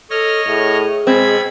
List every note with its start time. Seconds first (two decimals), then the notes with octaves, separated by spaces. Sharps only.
0.10 A4 C#5 D#5 F6
0.47 A2 G#4
1.07 B2 G#3 C4 B5 G#6